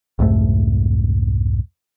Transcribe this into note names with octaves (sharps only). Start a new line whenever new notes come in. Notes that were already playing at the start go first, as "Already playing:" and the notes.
C2 F2 G#2 A3